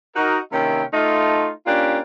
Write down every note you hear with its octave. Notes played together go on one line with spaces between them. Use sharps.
D#4 F#4 A#4
C3 D#3 A#3 C#4 E4 G5
A3 D#4 F4
A#3 C#4 D4 F4 G4